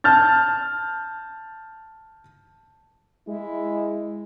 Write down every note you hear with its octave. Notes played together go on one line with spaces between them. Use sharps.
A5 F6 G6 A6
G#3 E4